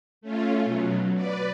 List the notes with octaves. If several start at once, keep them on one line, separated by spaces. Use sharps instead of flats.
A3 C#4 F4
B2 F#3
B4 D5